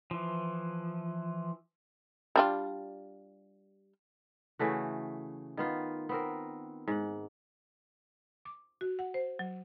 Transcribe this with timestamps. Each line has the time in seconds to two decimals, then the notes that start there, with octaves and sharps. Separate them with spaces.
0.11 E3 F3
2.36 G3 D4 F4
4.59 C#3 E3 A3 F#4
5.57 D#3 B3 F4
6.09 B3 C4 A#4
6.88 G#2 F#5
8.45 D6
8.81 F#4
8.99 F#5
9.14 C5
9.39 F#3